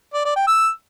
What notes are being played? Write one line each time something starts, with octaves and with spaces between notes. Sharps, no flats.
D5
D5
G5
E6